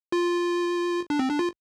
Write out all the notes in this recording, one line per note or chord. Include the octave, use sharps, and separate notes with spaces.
F4
D4
C4
D4
F4